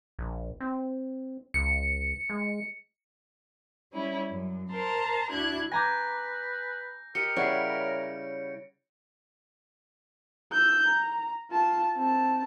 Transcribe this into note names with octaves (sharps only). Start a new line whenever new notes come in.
A#1
C4
C#2 C#7
G#3
G3 C#4 E4
F#2
A#4 C5 A5 A#5 C6
D2 D4 E4 F#4 F#6 G#6
B4 G#5 A#5 D6 G6 A#6
G4 A#4 D#5 C#7
C#3 G3 E4 C#5 F#5 C7 D7
E6 G6
A#5
F4 A5
C4 A5